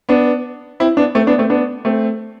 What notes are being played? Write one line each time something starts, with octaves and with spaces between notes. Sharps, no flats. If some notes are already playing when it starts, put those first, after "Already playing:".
B3 D4
C4 E4
B3 D4
A3 C4
B3 D4
A3 C4
B3 D4
A3 C4